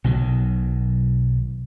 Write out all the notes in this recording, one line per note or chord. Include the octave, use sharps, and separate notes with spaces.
B1 B2 D#3 F#3